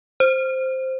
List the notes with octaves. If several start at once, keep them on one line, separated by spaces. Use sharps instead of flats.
C5